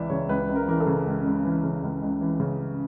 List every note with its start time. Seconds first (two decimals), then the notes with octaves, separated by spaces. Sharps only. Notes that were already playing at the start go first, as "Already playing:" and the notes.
Already playing: C#2 E3 D5 E5
0.10 C#3 C#5
0.29 C#2 B4
0.49 C#2
0.56 A#4
0.68 E3 A#4
0.80 A4
0.87 C#3
1.07 C#2
1.26 C#2
1.45 E3
1.63 C#3
1.83 C#2
2.02 C#2
2.21 E3
2.40 C#3